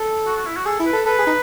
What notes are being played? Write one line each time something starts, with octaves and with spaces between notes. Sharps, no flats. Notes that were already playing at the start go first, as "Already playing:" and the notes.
Already playing: A4
F#4
F#4
E4
F#4
G#4 A4
E4
B4
A4
A4 B4
G#4
D#4